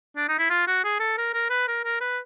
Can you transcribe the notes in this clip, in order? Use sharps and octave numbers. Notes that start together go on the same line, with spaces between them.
D4
D#4
E4
F4
F#4
G#4
A4
A#4
A#4
B4
A#4
A#4
B4